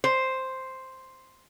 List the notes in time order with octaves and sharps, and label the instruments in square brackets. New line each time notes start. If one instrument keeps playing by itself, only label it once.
[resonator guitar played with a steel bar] C5